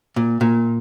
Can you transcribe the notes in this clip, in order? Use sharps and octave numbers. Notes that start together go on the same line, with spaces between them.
A#2
A#2